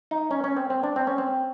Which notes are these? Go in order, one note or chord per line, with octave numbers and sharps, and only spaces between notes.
D#4
C#4
C#4
C4
C4
D4
C4
C#4
C4